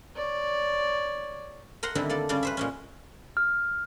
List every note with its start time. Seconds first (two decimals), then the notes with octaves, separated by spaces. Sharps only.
0.16 C#5 D5
1.83 A#4 C5 F#5 A#5 C6
1.95 D3 D#3 G3 C4 D4 E4
2.10 A#3 A4 D5
2.29 C#3 G3 C#4 D5
2.43 B4 C5 E5
2.57 A#2 G#3 C#4
3.37 F6